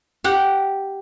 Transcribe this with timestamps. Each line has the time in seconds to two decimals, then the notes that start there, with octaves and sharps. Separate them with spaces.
0.24 G4 F#5